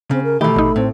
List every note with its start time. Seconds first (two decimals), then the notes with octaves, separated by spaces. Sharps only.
0.11 C#3 C4
0.23 A#4
0.41 B2 D#3 E3 A3 G4 A4 B5
0.56 A1 D#4
0.76 A2 C4